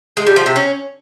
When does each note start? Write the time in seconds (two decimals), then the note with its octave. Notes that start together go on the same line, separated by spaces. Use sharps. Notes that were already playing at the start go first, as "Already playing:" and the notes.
0.17 G#3
0.27 G3
0.36 F3
0.46 C3
0.56 C#4